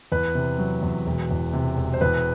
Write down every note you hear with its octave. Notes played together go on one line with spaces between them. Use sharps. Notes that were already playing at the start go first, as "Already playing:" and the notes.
E2 B4
C3
F#3
E2
E1
E2
C3
E1
C5
E2 B4